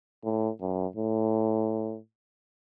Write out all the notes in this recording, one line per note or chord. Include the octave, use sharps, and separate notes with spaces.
A2
F#2
A2